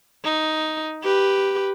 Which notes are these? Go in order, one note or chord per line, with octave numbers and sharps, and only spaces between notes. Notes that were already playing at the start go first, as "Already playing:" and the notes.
D#4
G4 B4